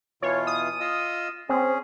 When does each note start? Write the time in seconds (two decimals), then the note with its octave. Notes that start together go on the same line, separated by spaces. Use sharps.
0.22 B2 E3 F4 C#5
0.47 D#6
0.80 F4 D#5 E6
1.49 C4 C#4 G#4